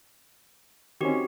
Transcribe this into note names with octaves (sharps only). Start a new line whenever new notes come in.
D#3 C4 C#4 F#4 G4